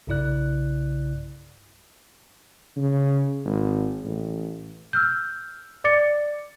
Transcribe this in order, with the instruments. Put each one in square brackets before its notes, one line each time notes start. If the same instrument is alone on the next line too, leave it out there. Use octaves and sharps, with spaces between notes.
[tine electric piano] B1 G2 C#3 E4 D5 F#6
[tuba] C#3
G#1
A1
[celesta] E6 F6 G6
D5 D6 A6 C#7